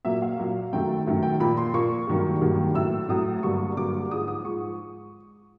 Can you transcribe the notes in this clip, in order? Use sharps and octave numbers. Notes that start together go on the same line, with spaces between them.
A#2 F#3 A#3 E5
F5
A#2 F#3 A#3
F#2 D#3 F#3 A3 G5
F#2 D#3 F#3 A3
G5
A#2 F3 A#3 B5
C6
A#2 F3 A#3 C#6
G2 D#3 F#3 A#3
G2 D#3 F#3 A#3
A2 F#3 A3 E6
A2 F#3 A3 D#6
G2 D3 F#3 A#3 C#6
G2 D3 F#3 A#3 D6
G#2 F3 G#3 D#6
D#6
G#2 F3 G#3 C#6